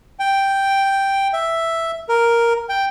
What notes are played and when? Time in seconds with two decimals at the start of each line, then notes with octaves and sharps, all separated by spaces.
0.19 G5
1.33 E5
2.09 A#4
2.69 G5